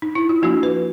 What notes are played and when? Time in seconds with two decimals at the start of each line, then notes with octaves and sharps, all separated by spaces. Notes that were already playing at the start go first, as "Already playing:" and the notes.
0.02 D#4
0.15 E4
0.29 F4
0.42 F3 A#3 D4 F#4
0.63 B4